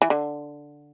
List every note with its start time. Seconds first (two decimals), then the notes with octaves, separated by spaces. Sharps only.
0.02 E3
0.10 D3